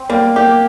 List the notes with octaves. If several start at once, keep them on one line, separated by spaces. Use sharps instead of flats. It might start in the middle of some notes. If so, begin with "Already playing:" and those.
Already playing: C4
G3 A#3
A#3 G4